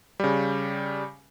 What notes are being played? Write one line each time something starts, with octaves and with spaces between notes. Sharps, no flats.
C#3 G3